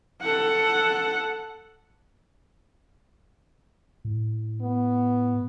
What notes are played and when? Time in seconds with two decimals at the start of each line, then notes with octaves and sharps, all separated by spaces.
0.22 A4 F#5
4.05 A2
4.62 B3